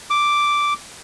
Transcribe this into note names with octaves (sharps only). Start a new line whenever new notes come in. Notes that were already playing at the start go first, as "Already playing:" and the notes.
D6